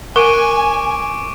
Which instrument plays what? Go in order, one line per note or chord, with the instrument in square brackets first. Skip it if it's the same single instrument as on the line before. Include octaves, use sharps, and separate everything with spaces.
[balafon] A#4 [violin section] G#5 [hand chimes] C#6 [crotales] D6 D7 D#7